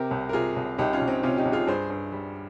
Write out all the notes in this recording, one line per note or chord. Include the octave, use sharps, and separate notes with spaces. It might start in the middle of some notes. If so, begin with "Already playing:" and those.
Already playing: C3 G4 A#4
C2
A#4
C3 F4 G#4
C2
C2 D#4 G4
C#4 F4
C2
C4 D#4
C3 C#4 F4
D#4 G4
C2
F4 G#4
G2 G#4 C5
G2
G3